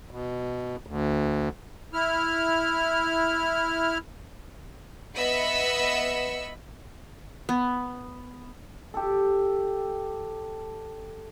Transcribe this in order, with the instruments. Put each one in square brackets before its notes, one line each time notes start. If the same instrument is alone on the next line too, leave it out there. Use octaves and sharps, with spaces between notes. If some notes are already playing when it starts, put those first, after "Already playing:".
[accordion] B2
D2
E4 F6
[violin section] B3 D#5 E5 B5 E6 C#7
[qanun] B3
[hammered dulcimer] G4 A4